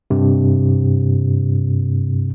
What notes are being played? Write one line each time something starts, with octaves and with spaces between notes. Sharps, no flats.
G2 C3